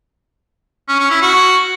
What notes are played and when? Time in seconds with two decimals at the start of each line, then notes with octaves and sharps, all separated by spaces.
0.88 C#4
0.99 C#4
1.10 E4
1.21 F#4